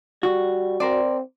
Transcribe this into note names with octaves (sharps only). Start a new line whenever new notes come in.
G3 F#4
C4 A#4 C5 D5